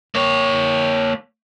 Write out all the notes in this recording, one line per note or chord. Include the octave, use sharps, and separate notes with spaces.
A#3 C#5